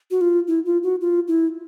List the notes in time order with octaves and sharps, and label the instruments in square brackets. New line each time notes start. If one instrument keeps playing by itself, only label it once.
[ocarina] F#4
F4
E4
F4
F#4
F4
E4